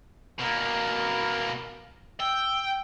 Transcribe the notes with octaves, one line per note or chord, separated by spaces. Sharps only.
B2 A#3 A#4
G5 E6